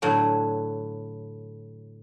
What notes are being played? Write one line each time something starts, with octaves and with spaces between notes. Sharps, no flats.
A2 D3 F#3